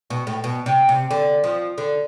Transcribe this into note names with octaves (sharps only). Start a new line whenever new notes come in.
B2
A2
B2
C3
C3
D3
F3
D3